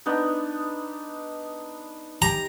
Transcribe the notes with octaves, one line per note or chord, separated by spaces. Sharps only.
B3 D4 D#4
G4 A#5